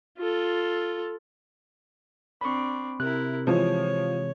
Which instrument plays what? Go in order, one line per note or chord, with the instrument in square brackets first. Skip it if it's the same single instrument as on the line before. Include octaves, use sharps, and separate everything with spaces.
[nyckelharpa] F4 A4
[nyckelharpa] C4 D4 [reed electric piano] B5 C#6
[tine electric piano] C3 [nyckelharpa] E4 A#4 [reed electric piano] F#6
[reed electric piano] E3 G#3 [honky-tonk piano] F3 [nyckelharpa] C#5